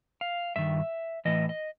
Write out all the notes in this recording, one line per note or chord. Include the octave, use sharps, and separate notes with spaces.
F5
G2 D#3 E5
A2 E3 D#5
D#5